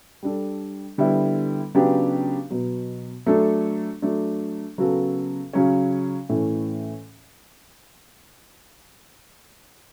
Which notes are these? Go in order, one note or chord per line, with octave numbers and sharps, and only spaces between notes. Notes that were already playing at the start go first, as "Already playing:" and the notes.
G3 D4 A4
D3 G3 B3 E4
C#3 F#3 B3 D4 G4
B2 F#3 B3
F#3 A3 D4 A4
F#3 A3 D4
C#3 F#3 B3 F#4 A4
C#3 F#3 C#4
A2 E3 A3 C#4